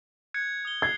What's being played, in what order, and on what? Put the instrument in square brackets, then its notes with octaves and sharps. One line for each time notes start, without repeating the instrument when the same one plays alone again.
[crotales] F#6 G#6 C#7
D#6 G7
[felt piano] G#6 [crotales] C7